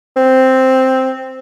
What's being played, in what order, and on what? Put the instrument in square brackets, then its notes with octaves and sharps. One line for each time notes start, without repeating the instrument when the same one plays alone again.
[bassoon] C4